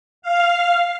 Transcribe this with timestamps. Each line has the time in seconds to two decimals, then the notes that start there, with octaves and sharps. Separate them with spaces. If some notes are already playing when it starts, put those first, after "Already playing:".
0.22 F5